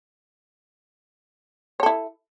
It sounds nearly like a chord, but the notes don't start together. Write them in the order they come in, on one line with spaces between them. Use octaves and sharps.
C#5 A4 E4